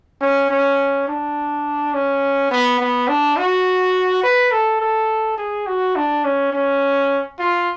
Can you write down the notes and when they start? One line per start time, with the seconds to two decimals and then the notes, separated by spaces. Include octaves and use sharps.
0.21 C#4
0.50 C#4
1.08 D4
1.94 C#4
2.51 B3
2.80 B3
3.08 D4
3.37 F#4
4.23 B4
4.52 A4
4.81 A4
5.38 G#4
5.67 F#4
5.96 D4
6.24 C#4
6.53 C#4
7.39 F4